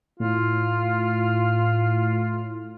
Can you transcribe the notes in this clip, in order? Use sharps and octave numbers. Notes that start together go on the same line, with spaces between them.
A2 F4